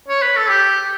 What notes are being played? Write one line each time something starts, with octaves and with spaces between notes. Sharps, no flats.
C#5
B4
A4
G4